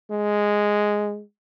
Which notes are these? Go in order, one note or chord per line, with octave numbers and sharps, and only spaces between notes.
G#3